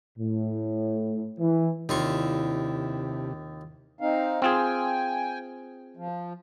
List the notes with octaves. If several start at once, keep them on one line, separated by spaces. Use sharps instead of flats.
A2
E3
D#2 C3 D4 E4 F4 C#6
C4 D#4 F5
C4 F4 G#4 G5 G#5
F3